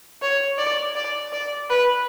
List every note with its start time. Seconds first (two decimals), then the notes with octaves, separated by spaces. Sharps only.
0.22 C#5
0.58 D5
0.95 D5
1.32 D5
1.70 B4